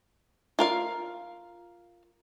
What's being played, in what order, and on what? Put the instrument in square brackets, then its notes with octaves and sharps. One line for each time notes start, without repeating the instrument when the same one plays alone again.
[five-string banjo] F4 A#4 F5